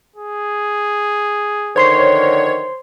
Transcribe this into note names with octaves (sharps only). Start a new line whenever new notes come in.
G#4
D3 D#3 F3 C5 C#5 C6 C7